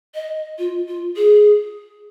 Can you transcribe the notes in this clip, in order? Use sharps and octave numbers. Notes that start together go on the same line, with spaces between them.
D#5
F4
F4
G#4